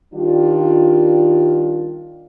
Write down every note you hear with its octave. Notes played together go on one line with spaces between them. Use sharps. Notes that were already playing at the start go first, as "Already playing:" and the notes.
D#3 G3 D4 F4